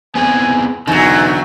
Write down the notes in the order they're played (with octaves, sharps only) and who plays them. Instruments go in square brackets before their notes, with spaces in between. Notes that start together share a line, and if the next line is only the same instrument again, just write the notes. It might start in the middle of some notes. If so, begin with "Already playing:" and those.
[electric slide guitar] B3 C4 G#4 [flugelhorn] G#5
[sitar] E2 F#3 [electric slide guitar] D3 D#4 [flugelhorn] G#5